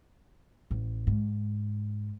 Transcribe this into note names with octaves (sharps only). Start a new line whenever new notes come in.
A1
G#2